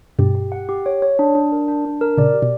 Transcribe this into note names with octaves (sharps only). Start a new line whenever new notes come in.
G2 B2 G4
G4
F#5
G4
C#5
C#5
D4
D4
A#4
D4
D4
A#4
A#2 C#3 D5
G4
B2